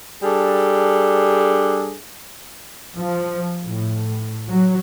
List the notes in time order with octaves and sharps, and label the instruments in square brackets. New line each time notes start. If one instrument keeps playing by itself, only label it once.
[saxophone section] G3 D4 G#4 A4
[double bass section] F3
A2
F#3